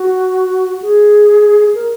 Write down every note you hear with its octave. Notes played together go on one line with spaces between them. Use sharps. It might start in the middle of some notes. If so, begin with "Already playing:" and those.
Already playing: F#4
G#4
A#4